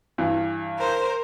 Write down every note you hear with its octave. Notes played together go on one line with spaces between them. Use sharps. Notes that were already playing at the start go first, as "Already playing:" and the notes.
G2 E3
A#4 C5